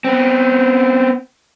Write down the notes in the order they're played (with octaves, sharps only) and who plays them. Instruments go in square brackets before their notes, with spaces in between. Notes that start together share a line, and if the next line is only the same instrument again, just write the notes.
[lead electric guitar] B3 C4